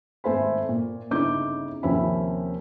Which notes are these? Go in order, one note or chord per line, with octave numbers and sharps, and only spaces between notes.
G#1 A3 C5 G#5 B5
A#2
G1 C#3 D#4 E4 D6 G6
D#2 C3 F3 C#4 E5 B5